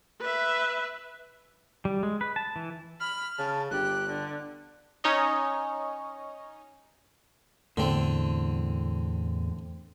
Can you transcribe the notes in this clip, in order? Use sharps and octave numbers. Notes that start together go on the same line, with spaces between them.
B4 E5
G3
G#3
B4
A5
E3
B5 F6
C#3 A5
G1 G4 F#6
D3
C#4 D#4 C#5 D#5
E2 A2 D3 C4